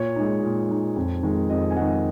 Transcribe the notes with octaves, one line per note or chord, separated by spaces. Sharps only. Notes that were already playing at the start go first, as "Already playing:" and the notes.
Already playing: A#2 C#5
G#3 D#4
A#2
G#3 D#4
F2
D#3 G#3
F2 D#5
G#5
D#3 G#3 D#5 F#5